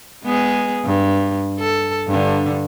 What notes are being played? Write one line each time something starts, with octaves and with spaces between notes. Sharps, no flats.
G#3 B3 G#4
G2
A4
G2 D3